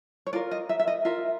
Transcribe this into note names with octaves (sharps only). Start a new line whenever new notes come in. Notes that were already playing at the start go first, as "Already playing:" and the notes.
C#5
F4 A#4 D5
D#5
E5
E5
D#5
F4 A#4 E5